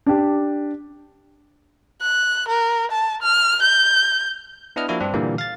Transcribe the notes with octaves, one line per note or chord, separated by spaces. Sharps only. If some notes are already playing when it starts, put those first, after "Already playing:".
D4 G4
F#6
A#4
A5
F6
G6
B3 D4 E4 B4 D#5 F6
F3 A#3 D4 E4 F#4
G2 C4 D4
A#2 D3 E3 G3 A#3
F5 A6